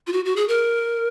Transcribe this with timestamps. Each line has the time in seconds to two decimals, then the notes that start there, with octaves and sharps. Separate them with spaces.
0.07 F4
0.12 F#4
0.25 F#4
0.36 G#4
0.48 A#4